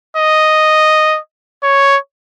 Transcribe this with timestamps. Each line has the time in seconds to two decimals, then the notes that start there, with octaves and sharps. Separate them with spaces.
0.17 D#5
1.63 C#5